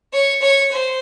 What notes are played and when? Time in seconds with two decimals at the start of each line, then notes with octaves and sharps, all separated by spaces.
0.13 C#5
0.41 C#5
0.71 C5